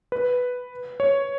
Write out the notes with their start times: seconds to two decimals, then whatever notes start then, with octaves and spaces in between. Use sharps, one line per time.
0.12 B4
1.00 C#5